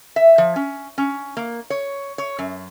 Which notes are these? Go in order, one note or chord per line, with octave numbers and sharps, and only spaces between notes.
E5
F3
C#4
C#4
A#3
C#5
C#5
F#2